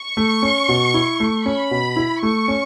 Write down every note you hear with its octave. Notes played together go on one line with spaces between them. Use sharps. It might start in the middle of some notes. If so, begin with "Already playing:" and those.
Already playing: C#6
A3
C#4
B2
E4
A3
C#4 B5
B2
E4
A3 C#6
C#4